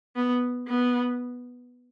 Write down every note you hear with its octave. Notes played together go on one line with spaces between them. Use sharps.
B3
B3